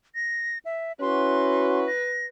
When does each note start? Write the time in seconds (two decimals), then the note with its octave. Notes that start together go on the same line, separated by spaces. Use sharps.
0.15 A#6
0.65 E5
1.01 C#4 E4 F#4 B4 C6
1.87 A#6